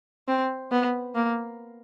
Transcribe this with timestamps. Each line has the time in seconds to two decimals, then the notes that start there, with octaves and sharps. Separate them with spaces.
0.28 C4
0.71 B3
1.15 A#3